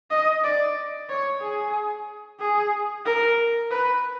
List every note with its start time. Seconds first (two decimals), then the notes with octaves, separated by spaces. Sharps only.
0.11 D#5
0.44 D5
1.10 C#5
1.42 G#4
2.40 G#4
3.05 A#4
3.71 B4